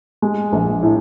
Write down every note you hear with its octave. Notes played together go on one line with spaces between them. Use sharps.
G#3
A#1
A2